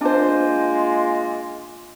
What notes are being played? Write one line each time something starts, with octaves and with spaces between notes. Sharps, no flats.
G#3 A#3 D4 F4 C5